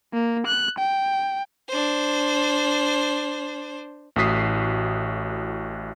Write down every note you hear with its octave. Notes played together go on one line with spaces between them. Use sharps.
A#3
F#6
G5
D4 C5
A1 A2 F#4 D#6 B6 C7